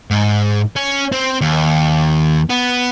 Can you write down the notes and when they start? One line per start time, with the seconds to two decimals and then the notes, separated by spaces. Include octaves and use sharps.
0.11 G#2
0.76 C#4
1.12 C4
1.41 D#2
2.50 B3